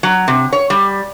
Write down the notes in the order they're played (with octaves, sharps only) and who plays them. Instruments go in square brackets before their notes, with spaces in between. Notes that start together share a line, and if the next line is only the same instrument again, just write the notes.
[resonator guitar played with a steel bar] F#3
C3
C#5
G3